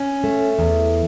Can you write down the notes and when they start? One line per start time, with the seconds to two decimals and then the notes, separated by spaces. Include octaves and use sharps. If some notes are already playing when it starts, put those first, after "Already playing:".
Already playing: C#4
0.24 A3
0.59 E2